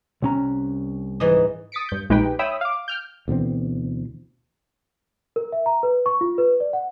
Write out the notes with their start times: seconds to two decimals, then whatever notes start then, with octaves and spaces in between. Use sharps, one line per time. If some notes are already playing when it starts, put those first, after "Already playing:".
0.22 C2 C#4 A#5
1.20 G#2 E3 D#5
1.72 D#6 A6 B6 C#7 D7
1.89 G2 G6
2.10 A#1 G#3 D#4 G4 B4 G5
2.39 C#5 E5 G5 B5 D#6 E6
2.61 F5 D6
2.88 G5 F6 G6
3.28 D2 B2 E3 C4
5.36 A#4
5.52 E5
5.66 A#5
5.83 B4
6.06 C#6
6.21 F4
6.38 B4
6.60 D5
6.73 F#5